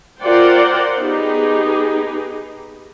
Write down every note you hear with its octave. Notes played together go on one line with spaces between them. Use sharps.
F4 A#4 C5 D5 F#5 G5
B3 D#4 G4 G#4